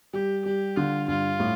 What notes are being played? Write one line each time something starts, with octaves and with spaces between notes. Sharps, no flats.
G3 G4
G3 G4
D3 F4
G2 F4
A2